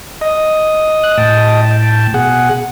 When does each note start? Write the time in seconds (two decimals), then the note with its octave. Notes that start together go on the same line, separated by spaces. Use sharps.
0.21 D#5
1.04 F#6
1.18 A2 G5 A5
2.14 B2 G#4 F#5